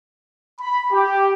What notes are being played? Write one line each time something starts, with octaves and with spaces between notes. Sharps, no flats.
B5
G4